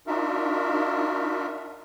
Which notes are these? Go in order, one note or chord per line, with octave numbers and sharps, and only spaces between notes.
D4 D#4 F4 F#4 A#4 E5